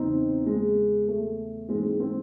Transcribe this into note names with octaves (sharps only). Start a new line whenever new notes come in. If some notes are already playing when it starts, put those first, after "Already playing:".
Already playing: E2 C#3 C4 D#4
G#3
A3
G#2 E3 G#3 C4
G#3 C4